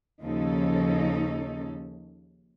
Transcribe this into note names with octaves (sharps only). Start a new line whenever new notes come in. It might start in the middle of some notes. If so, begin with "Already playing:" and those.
D#2 C#3 F3 C#4 D#4 A4